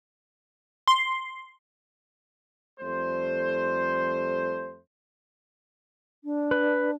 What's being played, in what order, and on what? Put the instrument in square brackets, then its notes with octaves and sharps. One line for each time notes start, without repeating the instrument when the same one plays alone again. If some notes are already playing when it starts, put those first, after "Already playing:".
[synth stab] C6
[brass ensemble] F2 G3 A3 C5
[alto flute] D4
[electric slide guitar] B4